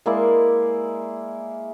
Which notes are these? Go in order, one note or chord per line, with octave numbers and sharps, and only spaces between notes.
G#3 A#3 E4 D5